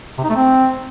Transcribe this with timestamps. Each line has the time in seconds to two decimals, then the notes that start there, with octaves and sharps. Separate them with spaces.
0.18 C3
0.24 D#4
0.30 A3
0.35 C4